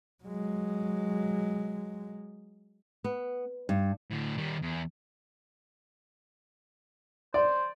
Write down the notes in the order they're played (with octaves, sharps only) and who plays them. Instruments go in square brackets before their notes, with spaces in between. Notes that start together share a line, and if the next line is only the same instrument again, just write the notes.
[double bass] F#3 G#3
[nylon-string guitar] B3
G2
[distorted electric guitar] A2 D3
D#3 G3
E2
[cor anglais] C5 [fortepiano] D5